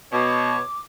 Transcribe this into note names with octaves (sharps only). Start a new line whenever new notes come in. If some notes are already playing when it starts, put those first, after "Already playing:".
B2 C#5 D6